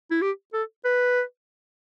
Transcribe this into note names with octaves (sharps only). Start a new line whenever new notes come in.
E4
G4
A4
B4